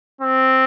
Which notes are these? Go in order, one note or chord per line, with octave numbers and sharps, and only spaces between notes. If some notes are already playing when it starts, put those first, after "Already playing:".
C4